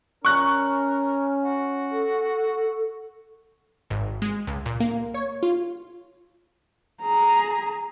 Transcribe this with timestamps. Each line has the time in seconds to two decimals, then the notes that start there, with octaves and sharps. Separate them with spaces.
0.25 C#4 A#4 C#6 F#6
1.45 F#4
1.92 A4
3.90 G#1
4.22 G#3
4.47 C#2
4.66 A#2
4.80 A#3
5.14 C#5
5.43 F4
7.02 G#4 A#5